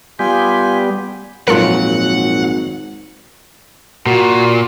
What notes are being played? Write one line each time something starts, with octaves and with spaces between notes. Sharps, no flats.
G3 B3 F4 G4 G#5
G#1 F2 A#2 F#3 F4 A4 A#4 F#5
A#2 F#4